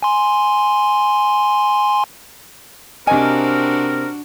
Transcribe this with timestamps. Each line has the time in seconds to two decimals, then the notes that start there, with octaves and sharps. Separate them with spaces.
0.03 G#5 C6
3.07 C3 C4 D4 F#4 A#4 D#5 G#5